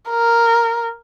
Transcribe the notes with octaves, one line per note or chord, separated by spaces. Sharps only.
A#4